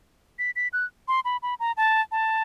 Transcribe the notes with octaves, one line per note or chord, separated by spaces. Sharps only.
B6
B6
F#6
C6
B5
B5
A#5
A5
A5